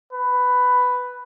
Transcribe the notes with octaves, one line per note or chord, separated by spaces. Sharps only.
B4